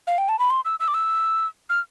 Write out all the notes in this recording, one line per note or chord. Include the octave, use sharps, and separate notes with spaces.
F5
G5
A5
B5
C6
E6
E6
D6
E6
F6